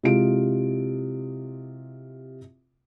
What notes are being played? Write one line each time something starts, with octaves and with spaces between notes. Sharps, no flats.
C3 G#3 E4 F4 D7